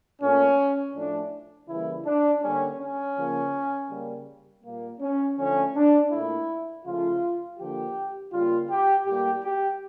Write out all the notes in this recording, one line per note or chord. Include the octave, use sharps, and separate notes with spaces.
A#2 A3 C#4
A2 F3 A3 D4
C#3 E3 G3 A#3 E4
D4
D3 G3 A#3 C#4
C#4
C#3 F3 A#3
C#3 G3 A#3
A#2 G3 A#3
C#4
D3 F3 A3 C#4
D4
A#2 A3 E4
C#3 F3 A3 F4
D3 F3 A#3 G4
C#3 G3 A#3 F4
G4
A2 G3 A#3 G4
G4